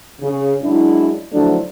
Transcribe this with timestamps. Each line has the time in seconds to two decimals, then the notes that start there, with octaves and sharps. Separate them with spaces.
0.21 C#3
0.63 F#2 F#3 G#3 D4 E4
1.33 D3 F3 F#3 A3 D4 E4